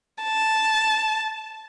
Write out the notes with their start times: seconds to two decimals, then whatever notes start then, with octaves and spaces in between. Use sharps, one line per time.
0.23 A5